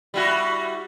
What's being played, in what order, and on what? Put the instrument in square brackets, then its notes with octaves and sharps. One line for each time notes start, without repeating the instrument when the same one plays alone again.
[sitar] G3 E4 F#4